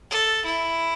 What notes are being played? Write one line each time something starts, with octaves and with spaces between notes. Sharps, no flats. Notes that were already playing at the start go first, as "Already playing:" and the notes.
A4
E4